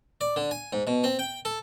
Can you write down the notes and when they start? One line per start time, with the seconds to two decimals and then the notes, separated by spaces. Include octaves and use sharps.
0.21 D5
0.36 D3
0.51 G#5
0.73 G#2
0.87 B2
1.04 C4
1.19 G5
1.45 A4